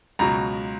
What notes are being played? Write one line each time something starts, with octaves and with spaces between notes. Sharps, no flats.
C#2 B2 F#3 A#5